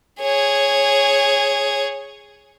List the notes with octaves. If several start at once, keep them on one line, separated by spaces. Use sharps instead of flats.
G#4 C#5